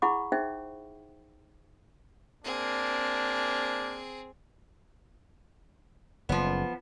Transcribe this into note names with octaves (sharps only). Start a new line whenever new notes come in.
E4 G#4 F#5 B5 C#6 D6
D#4 G#4 C5 E5 G5
A#3 C4 D4 G#4
F#1 F3 B3